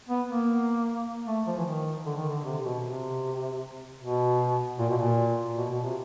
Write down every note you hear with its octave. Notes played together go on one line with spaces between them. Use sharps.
B3
A#3
A3
F3
E3
D#3
D3
D#3
D3
C3
B2
C3
B2
A#2
B2
A#2
B2
B2
C3